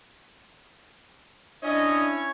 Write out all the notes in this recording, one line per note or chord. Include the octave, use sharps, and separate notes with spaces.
C#4 D4 E4 C#5 D#5